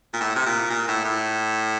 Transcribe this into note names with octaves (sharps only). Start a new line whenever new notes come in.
A#2
A2
C3
A#2
A#2
A2
A2